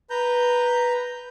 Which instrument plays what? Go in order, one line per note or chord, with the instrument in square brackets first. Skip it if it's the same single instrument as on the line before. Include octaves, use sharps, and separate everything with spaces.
[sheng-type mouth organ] B4 A#5 G6